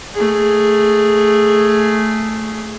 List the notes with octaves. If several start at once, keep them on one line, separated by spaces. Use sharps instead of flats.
A3 G#4